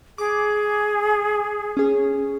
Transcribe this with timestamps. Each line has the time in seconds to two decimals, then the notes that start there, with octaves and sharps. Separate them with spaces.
0.18 G#4 D6
1.77 C#4 G#4